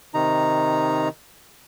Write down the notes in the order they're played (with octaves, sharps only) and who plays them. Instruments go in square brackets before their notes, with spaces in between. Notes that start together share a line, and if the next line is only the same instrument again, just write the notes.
[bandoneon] C3 D#3 D#4 A#5